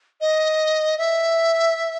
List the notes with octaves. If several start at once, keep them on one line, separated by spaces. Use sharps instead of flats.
D#5
E5